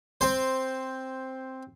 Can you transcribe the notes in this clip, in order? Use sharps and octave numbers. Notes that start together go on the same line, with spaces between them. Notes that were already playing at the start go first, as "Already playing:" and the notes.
C4 C5